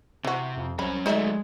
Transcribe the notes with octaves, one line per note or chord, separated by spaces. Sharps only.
C3 E3 F#4
F2
C2 F#2 C#4 B5
F#3 G#3 A3 D#4 D5 E5